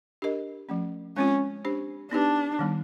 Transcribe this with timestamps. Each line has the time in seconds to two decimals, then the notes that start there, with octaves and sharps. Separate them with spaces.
0.22 D4 G4 A#4 D#5
0.69 F3 A3 C#4
1.17 G#3 C4 C#4 F4
1.65 D4 G4 C5
2.11 B3 D4 D#4 G4 B4
2.59 D#3 G3 B3 D#4